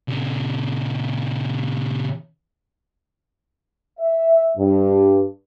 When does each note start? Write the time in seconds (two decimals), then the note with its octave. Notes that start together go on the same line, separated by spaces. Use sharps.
0.08 A#2 C#3
3.99 E5
4.57 G2